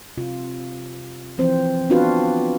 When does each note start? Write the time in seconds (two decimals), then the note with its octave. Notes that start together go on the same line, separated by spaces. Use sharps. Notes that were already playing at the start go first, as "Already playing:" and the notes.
0.17 C3 F4
1.38 E3 F3 C4 C5
1.90 B3 C4 D4 F4 F#4 B4